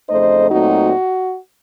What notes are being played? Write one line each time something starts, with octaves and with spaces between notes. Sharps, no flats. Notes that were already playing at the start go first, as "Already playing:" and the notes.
F2 C#3 A3 D#4 C5 D#5
A#2 F#3 A3 C4 D#4 F#4